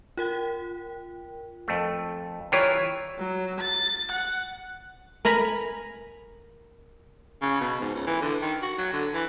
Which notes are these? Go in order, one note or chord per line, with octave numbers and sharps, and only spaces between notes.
F4 A#4 G5
F2 A3
E3 G3 E4 F4 C#5 A#5 C#6
F#3
A6
F#5
A#4 G#5 A#5 B5
C#3
B2
G#2
C#2
E3
D3
D#3
F#4
F#3
D3
E3